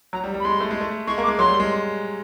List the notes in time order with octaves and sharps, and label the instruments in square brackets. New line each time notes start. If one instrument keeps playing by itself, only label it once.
[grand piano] F#3 [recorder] A#5
[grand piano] G3
G3
[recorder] B5
[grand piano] G#3 [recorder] C6
[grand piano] A3
G#3
A3
[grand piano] G#3 [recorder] C#6
[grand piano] A#3
[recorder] D6
[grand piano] G#3
[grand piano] F#3 [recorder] C6
[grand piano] G3
G#3